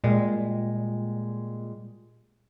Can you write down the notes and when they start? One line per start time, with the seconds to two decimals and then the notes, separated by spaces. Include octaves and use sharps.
0.04 A#2 G3 G#3